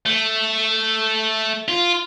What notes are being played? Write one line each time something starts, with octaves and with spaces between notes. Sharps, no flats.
A3
F4